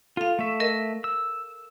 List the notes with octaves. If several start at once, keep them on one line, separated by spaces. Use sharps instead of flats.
F4 A4 F5
A3 E5 C#6
A#4 D#5
E6